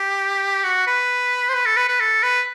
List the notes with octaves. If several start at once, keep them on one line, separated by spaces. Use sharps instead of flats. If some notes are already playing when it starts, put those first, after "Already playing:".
Already playing: G4
F#4
B4
C5
B4
A4
B4
B4
A4
B4